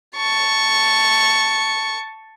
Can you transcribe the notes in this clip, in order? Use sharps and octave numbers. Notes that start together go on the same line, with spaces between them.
A5 C#6